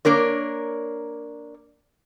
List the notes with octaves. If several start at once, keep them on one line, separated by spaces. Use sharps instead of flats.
A#3 D4 A#4 C#5